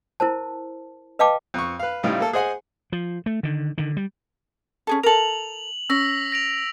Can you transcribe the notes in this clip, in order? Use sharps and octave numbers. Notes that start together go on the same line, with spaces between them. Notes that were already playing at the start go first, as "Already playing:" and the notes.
E4 A#4 C5 A5
B4 D#5 F5 G5 A5 D6
F2 C#6
B4 F5
A2 C#3 G3 D#4 F4
A#3 A4
G#4 C5 D#5 F#5 G#5
F3
A3
D3 D#3
D3 D#3
G3
C#4 G#4 A4
A4 A#4 F7 F#7
C#4 E6 A#6 B6
A#6 D7 F7